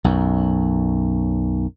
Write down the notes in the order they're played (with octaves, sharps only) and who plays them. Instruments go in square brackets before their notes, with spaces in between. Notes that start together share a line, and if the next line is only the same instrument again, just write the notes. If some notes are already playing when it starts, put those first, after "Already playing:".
[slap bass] B1 F#2